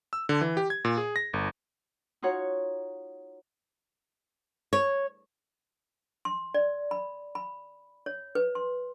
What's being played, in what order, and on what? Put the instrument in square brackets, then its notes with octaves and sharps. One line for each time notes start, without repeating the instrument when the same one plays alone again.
[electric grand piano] E6
D3
E3
G4
G#6
A#2
G#4
A#6
G1
[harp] D#4 F4 F#4 C#5 F#5
[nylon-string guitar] C#5
[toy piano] C6
D5
B5
B5
C#5
B4
C6